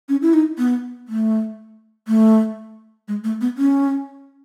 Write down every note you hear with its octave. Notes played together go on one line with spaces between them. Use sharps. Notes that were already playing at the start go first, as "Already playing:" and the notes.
C#4
E4
D#4
B3
A3
A3
G#3
A3
B3
C#4